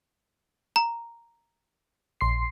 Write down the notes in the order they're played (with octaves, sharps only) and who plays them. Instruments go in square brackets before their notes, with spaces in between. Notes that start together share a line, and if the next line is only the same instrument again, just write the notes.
[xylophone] A#5
[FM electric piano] A#1 C6 C7